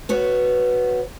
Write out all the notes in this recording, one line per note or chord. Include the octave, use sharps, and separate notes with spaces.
B3 F#4 C#5